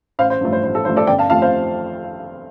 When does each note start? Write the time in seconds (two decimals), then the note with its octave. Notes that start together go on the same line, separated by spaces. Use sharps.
0.19 A1 C5 F5
0.30 C5
0.41 G2 F3 A3
0.53 C5
0.63 A1 C5
0.75 A4
0.85 G2 F3 A3 C5
0.97 A4 D5
1.07 G1 D5 G5
1.19 F5 A5
1.30 F2 F3 A3 F5 A5
1.42 C5 F5